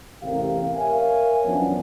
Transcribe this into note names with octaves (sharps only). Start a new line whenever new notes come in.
A1 E2 C3 G4 A#4 F5
A#4 C#5 E5 F5 G#5
F#2 E3 F3 B3 C#4 D4